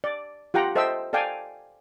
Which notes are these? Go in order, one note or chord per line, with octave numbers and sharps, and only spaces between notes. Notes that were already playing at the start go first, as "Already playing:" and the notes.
D5
F4 G4 F#5 G5 A#5
A4 C5 D#5 E5 G5 E6
A4 D5 F5 G5 G#5